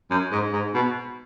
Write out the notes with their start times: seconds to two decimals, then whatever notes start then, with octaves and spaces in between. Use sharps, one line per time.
0.11 F#2
0.32 G#2
0.53 G#2
0.75 B2